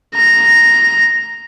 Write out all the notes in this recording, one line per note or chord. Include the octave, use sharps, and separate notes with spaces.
A#5